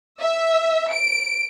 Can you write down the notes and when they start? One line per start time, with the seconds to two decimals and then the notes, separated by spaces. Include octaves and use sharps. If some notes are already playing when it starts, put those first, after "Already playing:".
0.21 E5
0.92 D7